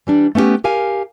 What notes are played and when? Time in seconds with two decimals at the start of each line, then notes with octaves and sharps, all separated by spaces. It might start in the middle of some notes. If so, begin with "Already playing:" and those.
0.07 E3 G3 D4
0.35 A3 B3 C#4 D#4 G4
0.64 G4 A#4 F5 G#5